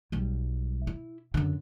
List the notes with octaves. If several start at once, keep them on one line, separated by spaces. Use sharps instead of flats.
B1 G3
E4
F#2 D3